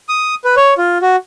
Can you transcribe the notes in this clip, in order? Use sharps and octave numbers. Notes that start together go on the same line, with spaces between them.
D#6
B4
C#5
F4
F#4